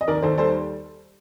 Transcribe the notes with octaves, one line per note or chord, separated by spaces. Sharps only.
D#5
D#2 A#4 D5
D#2 A4 C5
G3 A4 C5